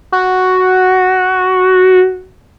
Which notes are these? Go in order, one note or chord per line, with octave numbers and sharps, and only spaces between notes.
F#4